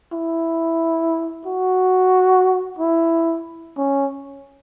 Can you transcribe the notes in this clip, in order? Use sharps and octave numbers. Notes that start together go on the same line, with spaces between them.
E4
F#4
E4
C#4